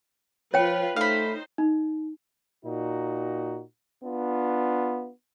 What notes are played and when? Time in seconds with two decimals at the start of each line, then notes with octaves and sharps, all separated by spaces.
0.54 F3 F4 B4 C#5 G5
0.96 A3 D#4 C5 F5 B5
1.58 D#4
2.65 A#2 D#4 F#4
4.04 B3 D4 F4